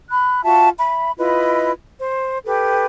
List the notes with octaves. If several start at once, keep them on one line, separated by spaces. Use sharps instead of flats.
B5 F#6
F4 F#4 E5 A5
E5 B5
E4 F4 B4 D#5
C5
G4 A4 B4